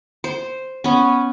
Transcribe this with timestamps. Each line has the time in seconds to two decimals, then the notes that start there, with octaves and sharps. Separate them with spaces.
0.24 C5
0.84 B3 C#4